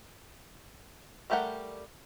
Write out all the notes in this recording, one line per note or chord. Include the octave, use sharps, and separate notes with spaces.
G3 A3 G4 A#4 F#5